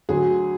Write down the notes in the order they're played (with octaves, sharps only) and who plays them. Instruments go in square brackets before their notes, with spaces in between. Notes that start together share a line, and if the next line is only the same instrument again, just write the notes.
[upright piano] D2 D3 F#3 F#4 G#4